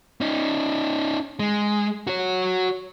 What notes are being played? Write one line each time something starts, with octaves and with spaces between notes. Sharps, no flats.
C#4 D#4
G#3
F#4 C#5